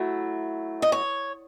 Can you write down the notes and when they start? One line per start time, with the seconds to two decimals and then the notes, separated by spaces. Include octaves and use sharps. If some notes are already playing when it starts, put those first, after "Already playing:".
Already playing: F#3 A3 E4
0.82 D#5
0.92 C#5